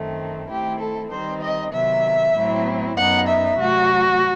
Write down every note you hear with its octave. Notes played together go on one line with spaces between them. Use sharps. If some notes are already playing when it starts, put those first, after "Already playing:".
Already playing: F#2 D#3 A3 C4
D#3 A3 C4 E4 G4
A4
D#3 G3 C4 D#4 C5
D#5
C3 D#3 F#3 B3 E5
A2 F#3 C4 E4
F#2 F#3 B3 D#4 F#5
E5
C3 F#3 A3 F#4